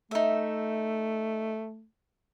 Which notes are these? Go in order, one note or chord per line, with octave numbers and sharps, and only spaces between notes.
A3 D#4 E5